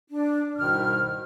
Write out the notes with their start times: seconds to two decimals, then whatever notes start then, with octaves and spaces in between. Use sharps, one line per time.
0.10 D4
0.57 C2 G#2 B2 D#3 F6